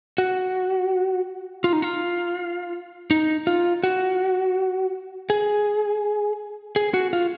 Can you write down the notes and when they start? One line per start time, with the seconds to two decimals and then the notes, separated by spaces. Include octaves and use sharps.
0.18 F#4
1.64 F4
1.73 D#4
1.82 F4
3.11 D#4
3.47 F4
3.83 F#4
5.30 G#4
6.76 G#4
6.94 F#4
7.13 F4